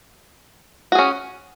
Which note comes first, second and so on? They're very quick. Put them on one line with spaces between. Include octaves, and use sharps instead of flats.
F#4 G#4 C#4